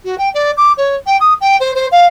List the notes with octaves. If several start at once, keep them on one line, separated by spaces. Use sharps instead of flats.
F#4
G5
D5
D6
C#5
G5
D#6
G5
C5
C5
F5